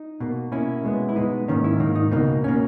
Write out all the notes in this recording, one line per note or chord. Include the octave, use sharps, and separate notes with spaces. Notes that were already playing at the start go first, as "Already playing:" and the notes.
Already playing: D#4
B2 A#3
B2 A#3 C#4 E4
B2 G#3 B3
E4
B2 G#3 B3 D#4
G#2 D#3 A#3 C#4
C#4 E4
G#2 D#3 A#3 D#4
D#4
C#2 B2 A#3 D#4
B2 A#3 C#4